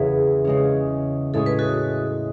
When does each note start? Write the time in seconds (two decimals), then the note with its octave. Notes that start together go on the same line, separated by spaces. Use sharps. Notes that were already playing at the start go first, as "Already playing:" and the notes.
Already playing: E2 C#3 E3 G#4 B4
0.44 C#3 G#3 C#4
1.34 A2 G#3 C#4 G#4 A4
1.46 B4
1.59 F#4 A4